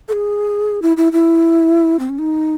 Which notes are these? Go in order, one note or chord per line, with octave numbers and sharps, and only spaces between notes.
A4
G#4
E4
E4
E4
C4
C#4
D#4